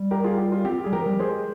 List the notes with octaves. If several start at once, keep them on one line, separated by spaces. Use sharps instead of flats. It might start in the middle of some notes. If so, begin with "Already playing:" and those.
Already playing: G3
G4 A#4
F4 G#4
G4
F4
C4 G4
G3 G#4
F3 G4 A#4
G3
G#3 G#4 C5